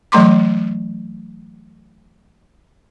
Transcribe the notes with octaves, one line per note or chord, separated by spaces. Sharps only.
E3 F#3 A3 A#5 C6 D6